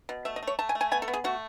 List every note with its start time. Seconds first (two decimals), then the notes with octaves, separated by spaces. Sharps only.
0.09 B2
0.25 A3 E5
0.36 D#5
0.43 A3 C#5
0.59 A3 A5
0.69 G#5
0.75 A3
0.81 G#5
0.91 B3 G#5
1.02 A4
1.08 B3
1.13 G#4
1.24 A3 F#4